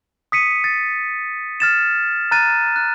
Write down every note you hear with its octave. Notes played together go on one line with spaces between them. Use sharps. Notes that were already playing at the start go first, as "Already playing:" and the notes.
D#6 B6 C#7 D#7
A6
F6 A6 E7
A#5 F6 F#6 A6 D#7
F#6